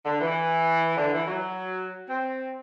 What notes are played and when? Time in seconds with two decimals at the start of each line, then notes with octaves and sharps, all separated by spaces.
0.06 D3
0.21 E3
0.97 D3
1.13 E3
1.27 F#3
2.09 C4